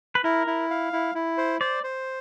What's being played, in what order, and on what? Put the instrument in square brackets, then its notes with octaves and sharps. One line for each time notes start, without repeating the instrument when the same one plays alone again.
[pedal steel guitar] B4
[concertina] E4 [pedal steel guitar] A#4
[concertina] E4
F5
E4
E4
C5
[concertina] C5 [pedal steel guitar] D5
[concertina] C5